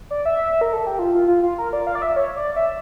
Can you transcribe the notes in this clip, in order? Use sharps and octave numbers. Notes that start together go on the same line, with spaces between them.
D5
E5
A#4
A4
G4
F4
F4
F4
F4
A#4
D5
F5
D5
E5
C#5
D5
E5